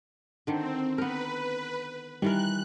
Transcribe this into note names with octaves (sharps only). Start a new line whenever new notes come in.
D3 D#3 C4
B3 A#4 B4
D#3 E3 G3 A#4 F#6